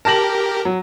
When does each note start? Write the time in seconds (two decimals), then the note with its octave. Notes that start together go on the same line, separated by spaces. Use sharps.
0.05 G4 A#4 A5 A#6 F#7
0.65 F#3